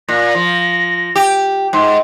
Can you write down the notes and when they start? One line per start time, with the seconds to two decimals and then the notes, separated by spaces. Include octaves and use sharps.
0.09 A#2 A#6
0.35 F3
1.16 G4
1.73 G#2 C6